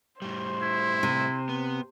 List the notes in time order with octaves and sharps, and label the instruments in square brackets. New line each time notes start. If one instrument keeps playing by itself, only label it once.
[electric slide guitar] A2 G3 [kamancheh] C5
[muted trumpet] E4
[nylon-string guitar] C3
[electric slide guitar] B3